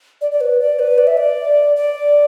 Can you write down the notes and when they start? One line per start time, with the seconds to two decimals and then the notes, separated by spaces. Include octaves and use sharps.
0.21 D5
0.32 D5
0.41 B4
0.60 D5
0.79 B4
0.98 D5
1.07 E5
1.17 D5
1.76 D5